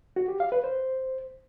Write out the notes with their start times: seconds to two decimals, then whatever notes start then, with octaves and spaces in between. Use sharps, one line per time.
0.16 F#4
0.28 G4
0.40 F5
0.52 B4
0.64 C5